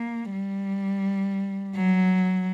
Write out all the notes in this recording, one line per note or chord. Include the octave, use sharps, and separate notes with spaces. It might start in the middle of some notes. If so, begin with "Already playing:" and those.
Already playing: A#3
G3
F#3